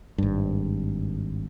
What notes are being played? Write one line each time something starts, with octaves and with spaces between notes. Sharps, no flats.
G#1 G2